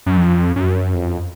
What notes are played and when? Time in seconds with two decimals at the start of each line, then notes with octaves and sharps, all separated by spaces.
0.06 F#2
0.17 F2
0.56 F#2
0.94 F2